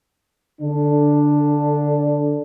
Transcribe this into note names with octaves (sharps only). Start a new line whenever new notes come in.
D3 D4